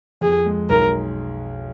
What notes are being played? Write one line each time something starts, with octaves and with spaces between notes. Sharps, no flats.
F2 G#4
G#3
B1 A#4